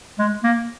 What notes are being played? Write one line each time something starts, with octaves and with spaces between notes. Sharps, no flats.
G#3
A#3